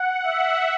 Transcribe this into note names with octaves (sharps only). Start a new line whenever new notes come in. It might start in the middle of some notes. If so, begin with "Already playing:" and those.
Already playing: F#5
E5